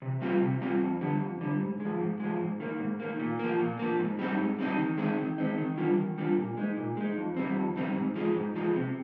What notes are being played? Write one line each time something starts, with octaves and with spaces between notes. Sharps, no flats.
C3
G3 C4 F4
C3
G3 C4 F4
F2
D3 G3
F2
D3 G3
G#2
G#3
F3
G#2
F3 G#3
G#2
D#3 A#3
G#2
D#3 A#3
A#2
F3 A#3
A#2
F3 A#3
G#2
G3 C4 D#4
G#2
G3 C4 D#4
D#3
G#3 C4 D#4
D#3
G#3 C4 D#4
D#3
G3 D4 F4
D#3
G3 D4 F4
A#2
G#3 D#4
A#2
G#3 D#4
F2
D#3 G3 C4
F2
D#3 G3 C4
G#2
F3 G#3
G#2
F3 G#3
C3